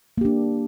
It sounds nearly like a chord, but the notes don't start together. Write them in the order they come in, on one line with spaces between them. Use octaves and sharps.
A#3 G4 D4